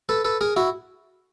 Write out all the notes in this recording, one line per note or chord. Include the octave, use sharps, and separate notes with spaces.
A4 B4
A4 B4
G#4 A#4
E4 F#4